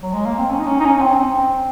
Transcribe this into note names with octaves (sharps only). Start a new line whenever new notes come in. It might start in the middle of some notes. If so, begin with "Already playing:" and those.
F#3
G#3
A#3
C4
C#4
D#4
C#4
D#4
C#4
C#4
C4
C4